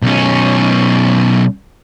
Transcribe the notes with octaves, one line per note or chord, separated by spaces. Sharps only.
B1 C#4